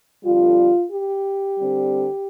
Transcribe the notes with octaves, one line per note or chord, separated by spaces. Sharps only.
F2 D3 G3 F4
G4
D3 G3 C4